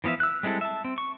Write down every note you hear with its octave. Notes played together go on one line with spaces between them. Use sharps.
E3 F3 B3 F4 E5
E6 F#6
G3 G#3 C4 E4 A4
E5 A5
C4
C#6